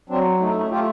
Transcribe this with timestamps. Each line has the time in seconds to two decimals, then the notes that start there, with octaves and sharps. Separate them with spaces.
0.10 F#3 C4 D4
0.40 A3 D#4
0.48 E4
0.56 C#4 D#4
0.71 A3 F4 G4